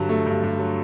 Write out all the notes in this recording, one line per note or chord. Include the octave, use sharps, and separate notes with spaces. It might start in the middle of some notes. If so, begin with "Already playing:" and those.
Already playing: G2 D3 F#3
A3
G2
G2
F#3